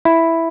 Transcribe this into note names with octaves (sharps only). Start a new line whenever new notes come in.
E4